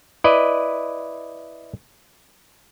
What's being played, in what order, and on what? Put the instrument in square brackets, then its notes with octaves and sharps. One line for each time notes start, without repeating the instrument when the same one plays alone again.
[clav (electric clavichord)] E4 B4 D5 D#5